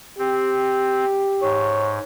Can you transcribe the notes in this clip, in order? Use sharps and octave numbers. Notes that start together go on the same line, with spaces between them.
C4 G4
G#2 C#5